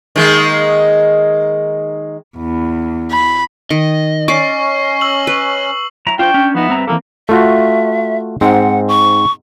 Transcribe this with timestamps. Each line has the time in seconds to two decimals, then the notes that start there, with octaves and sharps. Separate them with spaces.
0.16 D#3 G#3 A#3
2.38 E2
3.11 B5
3.70 D#3 D#5
4.28 C#4 D5 C#6 D6 C7
5.01 E6 F#7
5.27 B4
6.07 F#3 E4 A#5
6.19 D4 F4 C5 G5 C#6 G6
6.34 C#4
6.55 F3 B3 D#4 B4 E5
6.68 G2 C4 A#5
6.87 E3 G3 A#3 C4 A4
7.29 A3 F4 F#4 E5
8.41 G#2 C4 F#5
8.88 C#6